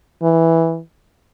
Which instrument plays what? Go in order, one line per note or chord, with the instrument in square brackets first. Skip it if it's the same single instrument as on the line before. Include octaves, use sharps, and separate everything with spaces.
[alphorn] E3